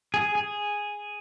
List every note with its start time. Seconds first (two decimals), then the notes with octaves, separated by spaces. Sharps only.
0.14 G#4
0.35 G#4